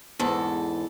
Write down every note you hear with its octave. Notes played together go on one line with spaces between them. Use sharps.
E2 G#2 A4